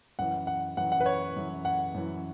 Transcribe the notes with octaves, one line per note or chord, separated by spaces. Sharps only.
F#2 E3 F#5
F#5
F#2 E3 F#5
F#5
B4
C#5
F#2 E3
F#5
F#2 E3